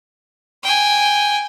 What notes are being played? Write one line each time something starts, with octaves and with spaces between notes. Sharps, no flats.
G5 G#5